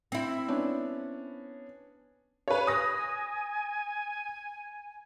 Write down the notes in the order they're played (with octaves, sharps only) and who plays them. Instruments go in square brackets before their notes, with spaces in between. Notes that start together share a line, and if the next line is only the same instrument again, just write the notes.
[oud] C4 E4
[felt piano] B3 C#4 D4
[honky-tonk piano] B4 C#5
[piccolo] G#5 [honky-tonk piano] D#6 A#6